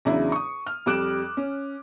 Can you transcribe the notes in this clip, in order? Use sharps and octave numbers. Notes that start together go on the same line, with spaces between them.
E2 C#3 F#3 D4 E4
C#6 D#6
F6
F2 G3 D6 F#6 D7 E7
C#4